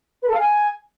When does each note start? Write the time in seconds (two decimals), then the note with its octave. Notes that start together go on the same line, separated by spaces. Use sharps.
0.22 B4
0.28 A4
0.34 F5
0.40 G#5